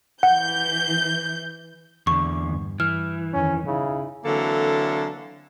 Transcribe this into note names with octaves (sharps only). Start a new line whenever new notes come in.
E3 F#5 G6
E2 D3 C#6
G2
E3 F6
F2 D#3 C#4
C#3 D#4 E4
D3 E3 F#3 A#3 C4 A4